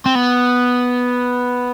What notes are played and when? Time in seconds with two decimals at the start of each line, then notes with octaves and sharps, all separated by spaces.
0.06 C4
0.15 B3